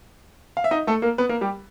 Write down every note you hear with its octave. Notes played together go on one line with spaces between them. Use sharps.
F5
E5
D#4 D#5
A3 A4
A#3 A#4
B3 B4
A#3 A#4
G3 G4